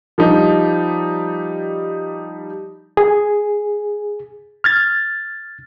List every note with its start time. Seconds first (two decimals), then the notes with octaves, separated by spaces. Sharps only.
0.18 F3 G3 D#4
2.97 G#4
4.64 F6 G#6 A6